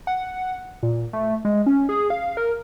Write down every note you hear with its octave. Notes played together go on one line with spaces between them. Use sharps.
F#5
A#2
A3
G#3
C#4
G#4
F5
A#4